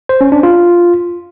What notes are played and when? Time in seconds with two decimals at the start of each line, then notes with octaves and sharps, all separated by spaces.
0.09 C5
0.21 C#4
0.32 D4
0.43 F4